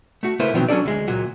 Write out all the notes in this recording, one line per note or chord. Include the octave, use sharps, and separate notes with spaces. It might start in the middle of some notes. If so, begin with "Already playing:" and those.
A3 F#4
C#3 A3 A#3 E4 B4 C5
B2 D#3 F3 F#3 C4
F#3 C#4 D4 A4 D5
D2 G#3
C#2 A#2 F#3